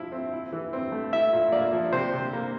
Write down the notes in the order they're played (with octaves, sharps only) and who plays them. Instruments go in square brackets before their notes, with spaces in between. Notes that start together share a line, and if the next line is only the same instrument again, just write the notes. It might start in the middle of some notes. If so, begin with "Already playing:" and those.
Already playing: [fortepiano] F3 E4 [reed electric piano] E5
[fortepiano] C4
E4
E3
C4
A3
[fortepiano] E4 [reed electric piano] E5
[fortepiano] A#2
[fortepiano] A#3 [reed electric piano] D5
[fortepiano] F3
[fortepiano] C3 [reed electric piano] C5
[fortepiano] C3
A#3